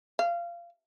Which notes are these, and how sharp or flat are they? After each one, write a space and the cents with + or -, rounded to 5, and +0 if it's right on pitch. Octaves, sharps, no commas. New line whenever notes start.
F5 -20